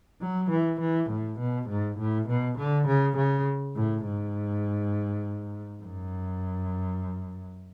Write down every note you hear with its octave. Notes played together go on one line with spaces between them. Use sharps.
F#3
E3
E3
A2
B2
G#2
A2
B2
D3
C#3
C#3
A2
G#2
F#2